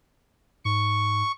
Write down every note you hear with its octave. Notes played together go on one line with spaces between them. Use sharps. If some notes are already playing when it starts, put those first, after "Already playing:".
G#2 C#6